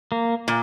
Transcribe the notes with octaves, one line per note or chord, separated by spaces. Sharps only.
A#3
A#2